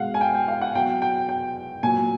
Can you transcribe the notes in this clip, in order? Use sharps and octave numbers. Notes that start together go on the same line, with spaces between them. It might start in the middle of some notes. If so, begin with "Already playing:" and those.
Already playing: B2 G#3 F5 F#5
G#5
G5
G5
F5
F#5
B2 F#3 G5
G5
G5
A#2 F#3 G#5